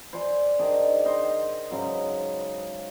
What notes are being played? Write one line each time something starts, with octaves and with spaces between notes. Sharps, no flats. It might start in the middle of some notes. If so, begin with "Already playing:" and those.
C5 D5 G#5 C6
D#3 D4 G#4 D6
C5 D#5 G5
G#2 C#3 F#3